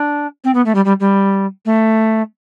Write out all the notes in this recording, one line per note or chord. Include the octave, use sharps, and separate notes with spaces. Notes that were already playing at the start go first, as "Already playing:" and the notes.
Already playing: D4
C4
B3
A3
G3
G3
G3
A3